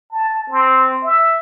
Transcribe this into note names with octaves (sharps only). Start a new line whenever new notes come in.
A5
C4
E5